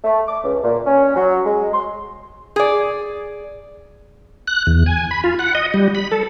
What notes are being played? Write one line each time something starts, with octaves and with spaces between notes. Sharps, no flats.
A3
D6
C#2
A#2
C#4
F#3
G#3
C6
G#4 D5
F#6
E2
G#5
B5
F4
F#5
D#5
G3
B5
A4